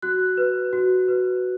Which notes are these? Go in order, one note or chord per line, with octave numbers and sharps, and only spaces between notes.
F#4 F#6
B4
F#4
B4